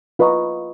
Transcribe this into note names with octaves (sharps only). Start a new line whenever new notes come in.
F4 B4 D#5 A#5 C#6